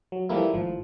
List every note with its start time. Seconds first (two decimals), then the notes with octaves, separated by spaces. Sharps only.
0.12 F#3
0.29 E3 F3 G3 A3 A#3 E4
0.54 G#1 A2 F3